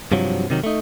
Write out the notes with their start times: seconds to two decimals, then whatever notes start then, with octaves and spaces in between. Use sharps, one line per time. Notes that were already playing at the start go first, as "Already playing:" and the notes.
0.12 G2 C3 F3 F#3
0.50 C3 D#3 F#3
0.64 A3 D#4